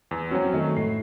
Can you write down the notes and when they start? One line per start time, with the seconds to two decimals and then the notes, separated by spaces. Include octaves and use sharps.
0.11 E2
0.31 F#3 C4 C#4 F#4
0.53 D#3 A3 D#4
0.77 A2 C7